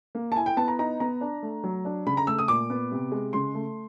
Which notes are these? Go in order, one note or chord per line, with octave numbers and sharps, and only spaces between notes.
A#3
A5
E4 G#5
G5
B3 A5
A#5
D#4 A#5
B3 A#5
D4
A3
F#3
D4
C#3 B5
A#5
A3 E6
D#6
A#2 D6
B3
C3
G#3
C#3 C6
A3